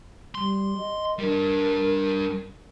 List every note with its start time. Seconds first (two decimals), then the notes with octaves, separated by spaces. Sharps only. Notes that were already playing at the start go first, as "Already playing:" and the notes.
0.35 G3 C6
0.78 D#5
1.19 G3 D4 A#4